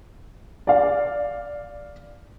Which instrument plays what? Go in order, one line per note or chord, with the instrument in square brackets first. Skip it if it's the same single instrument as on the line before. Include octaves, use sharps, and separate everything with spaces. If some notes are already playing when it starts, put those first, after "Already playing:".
[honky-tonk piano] D5 F5